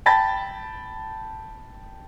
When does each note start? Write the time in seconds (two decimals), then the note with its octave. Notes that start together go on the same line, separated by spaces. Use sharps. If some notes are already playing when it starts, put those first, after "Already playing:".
0.06 G5 A5 B5 A6